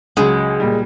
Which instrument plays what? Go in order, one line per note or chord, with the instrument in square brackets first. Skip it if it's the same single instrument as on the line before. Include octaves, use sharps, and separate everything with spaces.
[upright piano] C#2 C#3 F#3 [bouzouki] G#3
[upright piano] A#2 G3